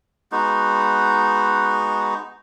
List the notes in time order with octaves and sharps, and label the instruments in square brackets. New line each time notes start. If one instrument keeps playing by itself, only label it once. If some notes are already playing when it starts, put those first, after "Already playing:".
[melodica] G#3 B3 D#4 F#4